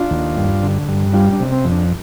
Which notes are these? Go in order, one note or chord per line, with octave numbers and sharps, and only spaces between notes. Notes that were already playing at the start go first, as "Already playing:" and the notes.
Already playing: D4 F4
D#2
G2
D3
G2
G3 D4 F4
D4
C3
C4
F2
D4